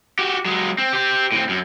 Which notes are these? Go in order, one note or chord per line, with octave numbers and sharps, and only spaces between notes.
F#4 G4
F#3 G#3
C4
G4 C5
A2 C4
F#2